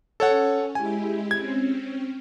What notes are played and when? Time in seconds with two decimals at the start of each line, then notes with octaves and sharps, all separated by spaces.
0.20 C#4 A4 C#5 F#5
0.75 G#3 E4 G4 G#5
1.31 C4 C#4 G#6